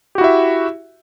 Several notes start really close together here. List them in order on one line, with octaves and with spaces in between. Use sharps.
G4 F#4 E4 E5